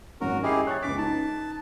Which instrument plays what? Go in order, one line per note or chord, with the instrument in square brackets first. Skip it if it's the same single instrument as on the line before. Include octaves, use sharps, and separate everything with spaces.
[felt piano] G#1 F#2 C#4 [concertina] F#4 A#4
[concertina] E4 G4 G#4 [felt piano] D#5 C7
[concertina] C#5 [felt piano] F#6 A6
[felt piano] C#2 C#3 B6 [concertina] D6
[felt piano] D#4 [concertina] A5